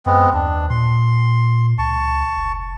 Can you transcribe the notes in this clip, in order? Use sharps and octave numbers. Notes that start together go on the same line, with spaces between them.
F#2 G#3 B3 C4
D#2 D4
A#2 C6
C#2 A5 C#6
F1